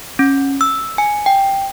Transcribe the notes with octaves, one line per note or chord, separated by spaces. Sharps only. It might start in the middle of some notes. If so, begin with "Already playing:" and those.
C#4
E6
G#5
G5